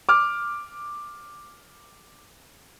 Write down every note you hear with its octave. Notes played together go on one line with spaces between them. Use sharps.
D6 F6